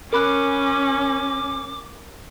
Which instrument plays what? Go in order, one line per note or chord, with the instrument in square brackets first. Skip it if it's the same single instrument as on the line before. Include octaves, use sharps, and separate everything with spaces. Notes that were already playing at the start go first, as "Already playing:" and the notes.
[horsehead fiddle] C#4 [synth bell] A#4 B5 F#6 [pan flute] D6